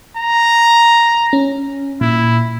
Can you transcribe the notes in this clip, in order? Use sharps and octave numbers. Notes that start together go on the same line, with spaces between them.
A#5
C#4
A#2 E4